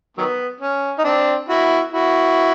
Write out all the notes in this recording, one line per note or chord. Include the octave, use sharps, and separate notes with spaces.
D#3 F#3 B3
C#4
D#4
C4 D4
E4 F#4
E4 F#4